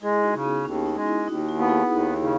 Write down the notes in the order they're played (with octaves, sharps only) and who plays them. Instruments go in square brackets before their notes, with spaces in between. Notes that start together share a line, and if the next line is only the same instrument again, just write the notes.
[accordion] G#3 [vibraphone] E4 G#4
[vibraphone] D#4 F#4
[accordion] C#3
[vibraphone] B3
[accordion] D#2 [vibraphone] C#4
[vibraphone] D#4
[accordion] G#3
[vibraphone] E4
[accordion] D#2 [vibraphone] D#4 F#4
[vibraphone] E4
[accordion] B3
[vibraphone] E4 G#4
[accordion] D#2 [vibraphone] D#4
[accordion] C#3